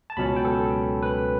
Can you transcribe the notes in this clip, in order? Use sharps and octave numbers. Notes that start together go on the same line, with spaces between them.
A5
C#2 B2 F#3 C#4 B5
A5
G5
A4
B4